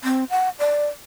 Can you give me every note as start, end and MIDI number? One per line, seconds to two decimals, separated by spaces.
0.04 0.24 60
0.30 0.49 78
0.59 0.86 74